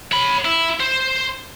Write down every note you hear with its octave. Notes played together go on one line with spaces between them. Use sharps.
C#5 B5
E4
C5